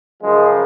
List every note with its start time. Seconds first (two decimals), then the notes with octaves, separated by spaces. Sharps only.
0.22 F#2 C#3 F3 G#3